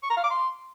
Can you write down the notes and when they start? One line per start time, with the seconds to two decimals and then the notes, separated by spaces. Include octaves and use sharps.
0.03 C#6
0.10 A#5
0.17 F5
0.24 D6
0.31 C6